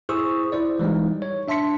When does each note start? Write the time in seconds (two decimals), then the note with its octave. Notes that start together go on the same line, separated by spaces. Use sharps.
0.09 E4 G#4 C5 C#6 D#6 E6
0.52 E4 C5 D5
0.79 E3 G3 G#3 D#4
1.22 C#5
1.48 D4 E5 A5 C6 B6 C#7